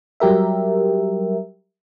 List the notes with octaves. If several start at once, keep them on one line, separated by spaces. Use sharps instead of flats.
F#3 G3 G4 A#4 E5